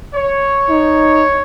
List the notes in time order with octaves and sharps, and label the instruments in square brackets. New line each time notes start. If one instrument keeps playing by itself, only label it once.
[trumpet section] C#5
[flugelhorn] D#4